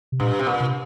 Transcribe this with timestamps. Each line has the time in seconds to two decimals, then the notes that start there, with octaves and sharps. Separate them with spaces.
0.12 C3
0.20 G2 A#2
0.39 C3
0.47 A#2
0.60 C3